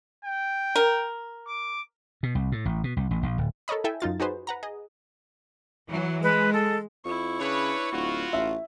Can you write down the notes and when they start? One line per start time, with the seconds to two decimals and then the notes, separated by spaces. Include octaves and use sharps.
0.24 G5
0.76 A#4
1.47 D6
2.23 B2
2.35 C2
2.52 A2
2.66 A1
2.84 B2
2.97 C2
3.11 A1
3.23 A#1
3.38 D1
3.68 A4 A#4 C#5 D#5 B5
3.84 E4 A4 E5 G5 G#5
4.00 F#2 D#4 F4 A6
4.20 D#4 F#4 G#4 B4 C5
4.47 B4 F#5 A#5
4.63 G#4 D#5
5.90 E3 F#3
6.23 G#3 B4
6.53 A4
7.05 F2 E4 C#6
7.40 C#3 D4 B4 C#5
7.92 D1 F4 F#4
8.33 A1 E5